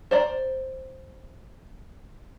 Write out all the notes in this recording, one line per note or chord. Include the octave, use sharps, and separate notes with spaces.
C5 D5 A#5